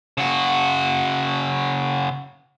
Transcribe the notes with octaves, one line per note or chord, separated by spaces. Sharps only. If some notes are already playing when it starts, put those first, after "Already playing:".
C#3 F#4